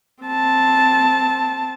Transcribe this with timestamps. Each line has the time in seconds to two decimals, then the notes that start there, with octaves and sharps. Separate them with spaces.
0.24 C4 A5